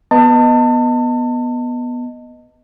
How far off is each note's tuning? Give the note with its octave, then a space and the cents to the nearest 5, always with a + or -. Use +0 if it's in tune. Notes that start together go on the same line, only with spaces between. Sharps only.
B3 -10 D#5 +0 A5 +30